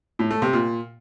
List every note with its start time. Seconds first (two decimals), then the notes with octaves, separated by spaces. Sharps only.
0.19 A2
0.31 A3
0.42 C3
0.53 A#2